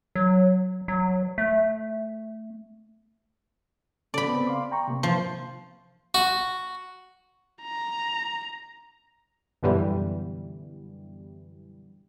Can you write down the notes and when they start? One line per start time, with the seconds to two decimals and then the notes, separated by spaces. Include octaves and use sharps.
0.15 F#3
0.88 F#3
1.38 A3
4.14 C#3 A4 D5 B5
4.28 B3 C4
4.47 F5 C6 D6
4.71 G5 A#5 C#6
4.88 C3 A#3
5.03 F3
6.14 F#4
7.63 A#5
9.63 F#2 B2 D3 E3 G3